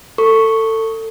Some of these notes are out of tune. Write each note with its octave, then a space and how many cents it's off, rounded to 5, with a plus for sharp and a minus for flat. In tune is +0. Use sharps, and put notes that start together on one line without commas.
A4 +25 C#6 +0